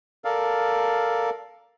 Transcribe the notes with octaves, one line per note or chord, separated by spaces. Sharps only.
A4 A#4 D5 F5